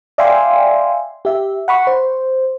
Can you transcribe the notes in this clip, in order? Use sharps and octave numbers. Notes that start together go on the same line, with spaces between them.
D5 E5 F5 G5 G#5 C6
G4 E5
F#5 B5 C#6
C5